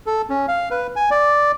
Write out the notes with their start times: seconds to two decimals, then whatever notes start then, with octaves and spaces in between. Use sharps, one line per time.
0.06 A4
0.30 C#4
0.48 F5
0.71 B4
0.96 G#5
1.11 D5